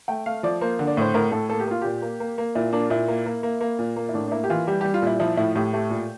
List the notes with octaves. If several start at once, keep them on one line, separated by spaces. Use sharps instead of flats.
A3 G5
A3 F5
F3 D5
A#3 C5
D3
D5
A2 C5
A2 A#4
A2 A4
A#3 A4
G4
A#3 F4
A#2 G4
A#3
A#3
A#3
A#2 E4
A#3 D4
A#2 E4
A#3
A#3
A#3
A#3
A#2
A#3
E4
A2 D4
D4
A#3 E4
G4
E3 F4
G3 G4
G3 G4
F4
A#2 E4
F3 E4
A2 E4
A2 G4
A3 G4
A#2